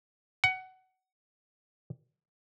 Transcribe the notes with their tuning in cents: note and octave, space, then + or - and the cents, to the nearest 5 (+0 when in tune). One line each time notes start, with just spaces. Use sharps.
F#5 +20